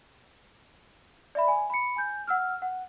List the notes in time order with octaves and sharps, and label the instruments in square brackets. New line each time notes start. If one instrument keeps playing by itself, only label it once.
[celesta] D5 E5 B5
G#5
B5 C#7
G#5 G6
F#5 E6 F6
F#5